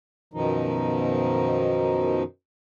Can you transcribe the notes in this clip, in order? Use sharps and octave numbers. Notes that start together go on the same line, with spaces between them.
F#2 B2 D#3 F3 D#4